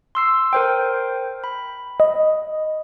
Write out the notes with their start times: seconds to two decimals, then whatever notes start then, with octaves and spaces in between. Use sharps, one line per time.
0.15 C6 E6 C7
0.53 A#4 C5 G5
1.44 B5
2.00 D#5